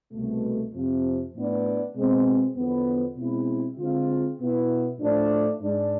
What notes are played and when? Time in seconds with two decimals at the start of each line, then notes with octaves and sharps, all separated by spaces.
0.13 C2 B2 A3
0.73 F2 C3 F3
1.34 A2 E3 B3 D4
1.95 B2 G#3 C4
2.56 E2 D3 F3 B3
3.17 B2 G#3 C4 E4
3.78 D3 G#3 C4 F4
4.40 B2 B3 E4
5.00 A2 F3 A3 D4
5.61 G#2 G#3 D4